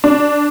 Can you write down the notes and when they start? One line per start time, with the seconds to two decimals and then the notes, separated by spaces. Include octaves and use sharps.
0.04 D4